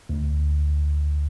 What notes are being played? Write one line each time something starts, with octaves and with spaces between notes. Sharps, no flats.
D2